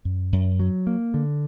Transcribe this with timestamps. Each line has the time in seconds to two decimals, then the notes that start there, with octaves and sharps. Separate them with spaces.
0.05 F#2
0.32 F#2
0.60 F#3
0.87 A#3
1.14 D3